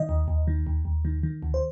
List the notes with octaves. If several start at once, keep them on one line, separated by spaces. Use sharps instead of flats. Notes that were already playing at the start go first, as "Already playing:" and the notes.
Already playing: D#3 D#5
D#2
D#2
D#3
D#2
D#2
D#3
D#3
D2
C5